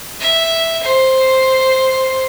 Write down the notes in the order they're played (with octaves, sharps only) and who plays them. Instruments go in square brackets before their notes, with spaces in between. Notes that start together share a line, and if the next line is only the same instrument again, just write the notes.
[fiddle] E5
C5